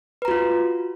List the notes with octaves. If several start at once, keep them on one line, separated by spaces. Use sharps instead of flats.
F4 F#4 B4 A#5